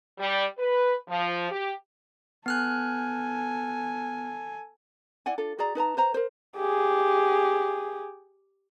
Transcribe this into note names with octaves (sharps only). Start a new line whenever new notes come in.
G3
B4
F3
G4
B3 A4 G#5 F6 F#6
E4 D5 F#5 G#5
D4 F4 A4
F#4 G#4 D5 A#5
D#4 B4 A5 A#5
B4 C5 A#5
A#4 C5
G4 G#4